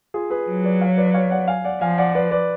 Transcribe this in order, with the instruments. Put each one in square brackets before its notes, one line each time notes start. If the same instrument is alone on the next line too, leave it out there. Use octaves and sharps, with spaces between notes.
[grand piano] F4 G#4
G#4 B4
[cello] F#3
[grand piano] B4 D5
C#5 F5
B4 D5
C#5 F5
D5 F#5
F5 G#5
D5 F#5
[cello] F3 [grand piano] F5 G#5
[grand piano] D5 F#5
B4 D5
B4 D5